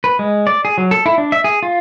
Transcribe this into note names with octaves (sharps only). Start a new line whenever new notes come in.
B4
G#3
D5
G#4
F#3
A4
E4
D4
E5
G#4
F4